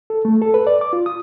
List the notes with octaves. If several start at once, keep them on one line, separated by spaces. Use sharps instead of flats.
A4
A3
A4
B4
D5
D6
F4
D#6